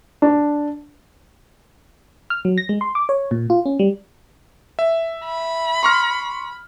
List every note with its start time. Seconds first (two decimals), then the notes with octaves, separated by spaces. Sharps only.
0.22 D4
2.30 F6
2.45 F#3
2.58 A#6
2.69 G#3
2.81 C6
2.95 D6
3.09 C#5
3.31 A#2
3.50 F4
3.66 C#4
3.79 G3
4.79 E5
5.26 B5
5.83 C6 C#6 F6